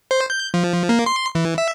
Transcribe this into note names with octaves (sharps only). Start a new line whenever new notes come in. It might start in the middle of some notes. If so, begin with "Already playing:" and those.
C5
G6
F3
A#3
C6
E3
E5